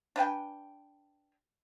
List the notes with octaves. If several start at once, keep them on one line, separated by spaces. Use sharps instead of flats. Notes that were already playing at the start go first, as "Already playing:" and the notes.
D4 B4 G5 G#5